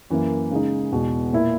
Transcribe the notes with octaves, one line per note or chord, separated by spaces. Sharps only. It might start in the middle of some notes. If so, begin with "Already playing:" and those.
F#2 E3 A#3 E4
C#3 G#3 D#4
E2 B2 G#3
A#2 A#3 E4